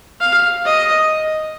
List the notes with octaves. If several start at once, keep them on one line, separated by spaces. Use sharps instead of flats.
F5
D#5